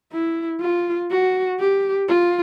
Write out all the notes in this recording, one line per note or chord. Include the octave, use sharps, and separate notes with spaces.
E4
F4
F#4
G4
F4